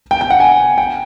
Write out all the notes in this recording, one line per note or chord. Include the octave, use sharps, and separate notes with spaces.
G5
G5
F#5
G#5
G5